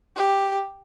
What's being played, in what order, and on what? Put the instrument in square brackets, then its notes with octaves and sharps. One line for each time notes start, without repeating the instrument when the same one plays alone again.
[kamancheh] G4